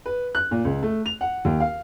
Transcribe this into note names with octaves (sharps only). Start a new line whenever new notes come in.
B4
F#6
A#2
C#2
A3
F7
F#5
D#2
F5